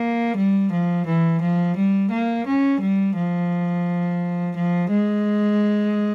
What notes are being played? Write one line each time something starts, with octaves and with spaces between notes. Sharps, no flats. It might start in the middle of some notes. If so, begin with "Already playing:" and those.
Already playing: A#3
G3
F3
E3
F3
G3
A#3
C#4
G3
F3
F3
G#3